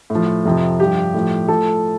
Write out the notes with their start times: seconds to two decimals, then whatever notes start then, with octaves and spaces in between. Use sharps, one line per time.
0.10 A2
0.15 F3
0.46 F2 C3 F3
0.80 G2 F3 G4
1.14 A2 F3
1.48 A2 F3 A4